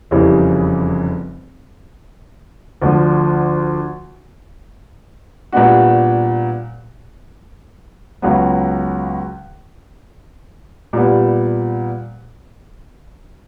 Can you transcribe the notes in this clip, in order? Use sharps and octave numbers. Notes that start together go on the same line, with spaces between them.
F1 E2 C#3 E3 G3
D2 D3 F3
A#2 G3 B3 D4 F#4
C#2 C#3 F#3 B3
A#2 G3 B3